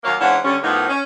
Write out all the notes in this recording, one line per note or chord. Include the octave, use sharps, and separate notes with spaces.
D#2 F#3 A#3 C#5 F5
G#2 E3 C#4 D4 F5 F#5
D3 G3 C#4
A2 F3 A#3 B3 D#4
C#4